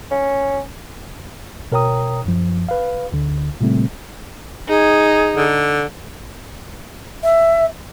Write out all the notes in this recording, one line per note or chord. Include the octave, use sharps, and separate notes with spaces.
C#4
B2 A#4 C#5 G5 A#5 D#6
F#2 F3
B4 F5
D2 D3
A#2 C#3 G3 A3 C4
D#4 G#4
D3
E5